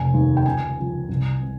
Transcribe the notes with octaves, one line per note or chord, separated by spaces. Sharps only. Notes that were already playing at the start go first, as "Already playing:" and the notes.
Already playing: F1 G#5
D#2 D#3
G5
C#2 G#5
C#3 F3
C2
C3